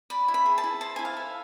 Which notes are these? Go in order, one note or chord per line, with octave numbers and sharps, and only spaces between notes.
D5 B5
E4
B5
G#4
A5
E4
C5 A5
E4 G#5
F5
A4